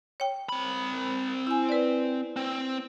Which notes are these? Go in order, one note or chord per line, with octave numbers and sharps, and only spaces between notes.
C#5 G5
C4 B5
E4 G#5
B4 D5
C4